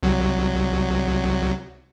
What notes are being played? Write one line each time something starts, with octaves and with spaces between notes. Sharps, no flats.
C2 F#3